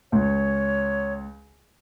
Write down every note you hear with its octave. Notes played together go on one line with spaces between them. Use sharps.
C#2 C#5